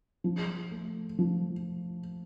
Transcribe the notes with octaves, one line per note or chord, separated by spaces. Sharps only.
F3
A3
F3